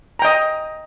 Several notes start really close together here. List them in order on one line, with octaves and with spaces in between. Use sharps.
A#5 G5 D#5